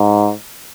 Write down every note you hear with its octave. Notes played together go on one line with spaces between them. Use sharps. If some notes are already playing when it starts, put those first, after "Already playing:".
Already playing: G#2